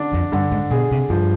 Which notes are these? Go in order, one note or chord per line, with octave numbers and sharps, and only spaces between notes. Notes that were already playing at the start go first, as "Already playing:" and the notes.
Already playing: D3 D4
F2
G2 D3
G#2
B2 G#4
C3
G2 F3